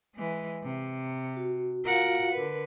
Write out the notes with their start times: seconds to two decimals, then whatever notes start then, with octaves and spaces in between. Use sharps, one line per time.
0.15 E3 G#3
0.63 C3
1.37 F#4
1.85 F4 F#4 A#4 F5 F#5
2.33 D3 A#4 B4